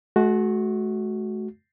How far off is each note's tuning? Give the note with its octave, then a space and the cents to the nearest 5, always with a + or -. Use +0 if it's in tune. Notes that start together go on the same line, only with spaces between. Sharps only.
A3 -45 F#4 +0